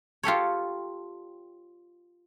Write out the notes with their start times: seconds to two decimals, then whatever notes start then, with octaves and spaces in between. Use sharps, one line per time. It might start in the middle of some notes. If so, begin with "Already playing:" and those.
0.23 F4 G4 A4 C#5